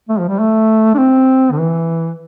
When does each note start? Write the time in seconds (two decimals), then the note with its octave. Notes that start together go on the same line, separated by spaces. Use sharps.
0.09 A3
0.19 F3
0.29 G3
0.40 A3
0.95 D4
0.98 C4
1.52 D3
1.58 E3